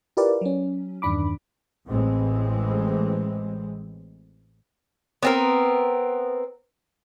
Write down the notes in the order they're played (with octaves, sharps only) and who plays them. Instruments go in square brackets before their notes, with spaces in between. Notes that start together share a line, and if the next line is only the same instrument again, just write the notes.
[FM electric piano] E4 F4 G4 A#4 B4 D5
F#3 C#4
E2 G2 D#3 D4 B5 D6
[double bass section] A1 A2 E3 G#3 C4
[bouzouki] B3 C4 A#4